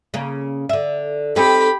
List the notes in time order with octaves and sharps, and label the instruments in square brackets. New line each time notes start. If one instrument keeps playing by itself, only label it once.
[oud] C#3 A#3
D3 E5
[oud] C4 D#4 A4 [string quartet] G4 B5